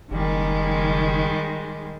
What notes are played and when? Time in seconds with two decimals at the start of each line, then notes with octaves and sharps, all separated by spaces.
0.11 F#1 D#3 G3 G#3